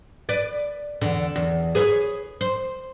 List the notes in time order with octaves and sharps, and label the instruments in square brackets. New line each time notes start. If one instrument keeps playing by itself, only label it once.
[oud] B4 D5
E2 D3
E2
G#4 B4 C#5
C5